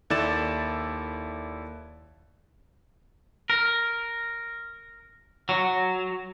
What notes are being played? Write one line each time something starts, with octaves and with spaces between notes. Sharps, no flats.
D#2 E4 A4 D5 A6 E7
A#4
F#3